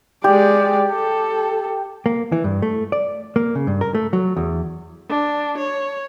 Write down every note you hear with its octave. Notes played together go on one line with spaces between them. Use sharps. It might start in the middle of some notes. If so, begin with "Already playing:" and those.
G#3 G4 D5
A4
A#3
E3
G2
A3
D5
A#3
C#3
G2
A#4
A3
F#3
E2
D4
C#5